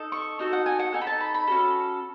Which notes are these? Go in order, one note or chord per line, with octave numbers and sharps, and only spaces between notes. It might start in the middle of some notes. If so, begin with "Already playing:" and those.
Already playing: D#4 A4
C#6
D#4 F#4 A4
F#5
G#5
F#5
D#4 A4 G#5
B5
A5
B5
B5
C#4 F#4 A4